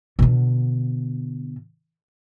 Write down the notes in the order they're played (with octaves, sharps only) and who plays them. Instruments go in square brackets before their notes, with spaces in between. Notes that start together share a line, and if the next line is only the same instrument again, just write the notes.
[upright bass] B2 D3